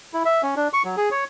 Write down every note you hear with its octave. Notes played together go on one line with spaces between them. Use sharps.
E4
E5
C#4
D4
C#6
F#3
G#4
C#5